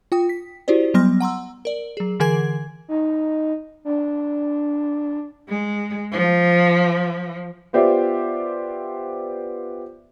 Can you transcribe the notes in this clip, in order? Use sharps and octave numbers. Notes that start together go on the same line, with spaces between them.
F4 G5 D#6
B6
E4 F#4 G4 C5 D5
F#3 G3 B3 C6 F6 A#6
F#5 A#5 C6 E6
A#4 D5
F#3 G#4
D3 E3 G#4 A#4 G#5 G#6
D#4
D4
G#3
F3
B3 F4 G4 C5 D5 E5